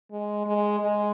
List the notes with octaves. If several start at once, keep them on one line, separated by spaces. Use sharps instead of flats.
G#3
G#3
G#3